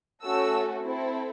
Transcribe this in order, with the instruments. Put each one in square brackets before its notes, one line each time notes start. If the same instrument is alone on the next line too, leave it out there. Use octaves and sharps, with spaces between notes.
[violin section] A3 C#4 F#4 A4 E6
C4 E4 A4